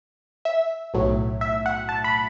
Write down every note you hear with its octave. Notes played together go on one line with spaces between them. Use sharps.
E5
B1 A2 F#3
E5
F#5
A5
B5